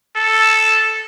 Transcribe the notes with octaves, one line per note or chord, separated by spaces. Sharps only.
A4